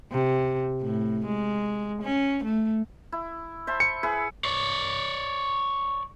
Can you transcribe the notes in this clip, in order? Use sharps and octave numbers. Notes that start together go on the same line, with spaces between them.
C3
A2
G#3
C#4
A3
E4
C5 E5 A5
C#7
E4 G#4 B4
C#5 D5